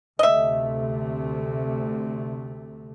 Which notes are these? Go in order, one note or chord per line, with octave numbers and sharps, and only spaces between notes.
D2 C3 A3 D#5 E5